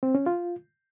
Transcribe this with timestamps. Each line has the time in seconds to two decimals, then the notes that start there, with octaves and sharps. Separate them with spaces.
0.03 C4
0.15 C#4
0.26 F4